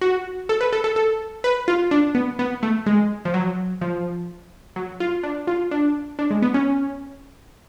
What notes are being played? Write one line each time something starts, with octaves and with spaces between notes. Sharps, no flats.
F#4
A4
B4
A4
A4
A4
B4
F4
D4
B3
B3
A3
G#3
F3
F#3
F3
F#3
F4
D4
F4
D4
D4
G#3
B3
C#4